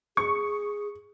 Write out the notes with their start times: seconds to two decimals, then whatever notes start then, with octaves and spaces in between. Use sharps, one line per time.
0.17 G#4 C#6